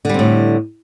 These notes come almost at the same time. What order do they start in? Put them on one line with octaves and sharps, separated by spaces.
D3 G3 C4 A2